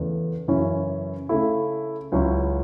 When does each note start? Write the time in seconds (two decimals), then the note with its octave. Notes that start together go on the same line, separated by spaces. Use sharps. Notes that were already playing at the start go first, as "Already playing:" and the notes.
Already playing: E2 C#3 A3
0.48 F#2 C#3 E3 C#4 E4
1.29 C#3 A3 E4
2.12 C#2 C#3 F#3 C#4 E4